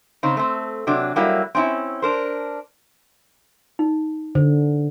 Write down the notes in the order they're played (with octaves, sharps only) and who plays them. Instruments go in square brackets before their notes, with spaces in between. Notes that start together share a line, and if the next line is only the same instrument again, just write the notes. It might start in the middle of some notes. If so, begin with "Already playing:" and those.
[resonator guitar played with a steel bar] C#3 C4 D#4
A3 C4
C3 F#3 D4
F#3 G3 A#3 E4
C4 C#4 D#4 E4
D4 A#4 C5
[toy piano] D#4
[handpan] D3 [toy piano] C5